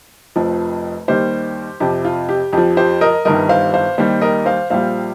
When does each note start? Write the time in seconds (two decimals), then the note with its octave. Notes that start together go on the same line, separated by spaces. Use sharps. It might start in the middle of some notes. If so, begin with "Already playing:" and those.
0.36 F1 F2 F3
1.08 D#2 D#3 G3 G4 C5
1.80 F2 C3 F3 G4
2.05 F4
2.29 G4
2.53 F2 F3 G4
2.77 G4 C5
3.01 A#4 D#5
3.25 G1 G2 D#3 G3 A#4 D#5
3.49 C5 F5
3.74 C5 F5
3.98 D#2 D#3 G3 G4 C5
4.21 A#4 D#5
4.46 C5 F5
4.70 A#1 A#2 G3 C5 F5